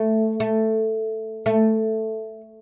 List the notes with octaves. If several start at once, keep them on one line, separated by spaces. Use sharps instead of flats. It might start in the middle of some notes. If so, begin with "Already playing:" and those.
Already playing: A3
A3
A3